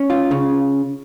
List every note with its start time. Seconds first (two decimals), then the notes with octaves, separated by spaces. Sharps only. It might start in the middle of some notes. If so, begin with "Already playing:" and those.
Already playing: C#4
0.10 F4
0.31 C#3